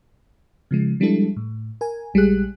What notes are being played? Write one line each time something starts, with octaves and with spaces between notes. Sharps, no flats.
C#3 F3 G#3
F3 G3 G#3 D4 E4 A4
A2
A#4 G#5
A#1 G3 G#3 G4 G#4 F#6